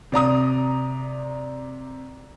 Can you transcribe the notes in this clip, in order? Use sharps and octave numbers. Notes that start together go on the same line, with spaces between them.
C3 D5 A#5 D#6